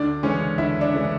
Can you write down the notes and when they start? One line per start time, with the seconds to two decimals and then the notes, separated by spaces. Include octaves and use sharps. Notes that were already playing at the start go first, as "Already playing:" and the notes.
Already playing: D2 D4 D5
0.23 C#3 E3 G#3 C#4 C#5
0.58 D2 E4 E5
0.81 D4 D5
0.93 C#3 E3 G#3